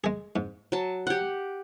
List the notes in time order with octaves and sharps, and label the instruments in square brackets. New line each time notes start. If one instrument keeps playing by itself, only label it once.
[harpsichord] G#3 G#4
G#2
[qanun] F#3 A5
G4 F#5